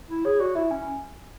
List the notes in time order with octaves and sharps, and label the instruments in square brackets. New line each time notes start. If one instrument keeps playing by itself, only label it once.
[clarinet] E4
[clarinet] G#4 [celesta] C#5
[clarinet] F#4 [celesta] D5
[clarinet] E4 [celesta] E5
[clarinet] C#4 [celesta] G#5